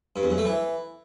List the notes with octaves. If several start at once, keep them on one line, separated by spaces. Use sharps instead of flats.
G2
E2
F#2
A3
E3